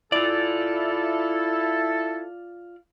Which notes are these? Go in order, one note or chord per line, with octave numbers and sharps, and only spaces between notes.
E4 F4 A4 D5